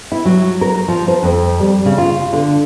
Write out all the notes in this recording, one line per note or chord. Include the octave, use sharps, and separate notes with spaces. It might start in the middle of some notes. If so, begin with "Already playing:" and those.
E4
F#3
A#4
F3
C5
F2
G3
C#3
F4
D3